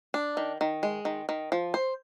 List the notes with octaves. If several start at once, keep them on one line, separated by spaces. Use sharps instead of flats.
D4
D#3
D#3
G#3
D#3
D#3
F3
C5